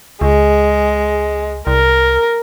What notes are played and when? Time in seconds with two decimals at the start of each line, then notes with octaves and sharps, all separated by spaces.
0.21 C#2 G#3
1.67 C2 A#4